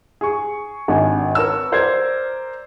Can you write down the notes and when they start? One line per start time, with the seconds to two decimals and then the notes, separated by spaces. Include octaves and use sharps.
0.21 G#4 C#6
0.88 G#1 D4 G#5
1.35 A#4 B4 C#5 A5 E6
1.72 A#4 C5 D5 G#6